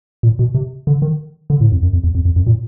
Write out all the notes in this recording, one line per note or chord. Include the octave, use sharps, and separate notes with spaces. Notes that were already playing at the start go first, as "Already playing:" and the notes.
A#2
B2
C3
D3
D#3
D3
A2
F2
F#2
F2
E2
F2
F2
F#2
A#2